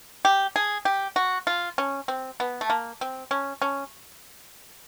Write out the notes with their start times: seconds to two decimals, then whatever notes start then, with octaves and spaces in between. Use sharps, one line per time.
0.25 G4
0.56 G#4
0.85 G4
1.16 F#4
1.47 F4
1.78 C#4
2.08 C4
2.40 B3
2.61 A3
2.70 A#3
3.01 C4
3.31 C#4
3.62 C#4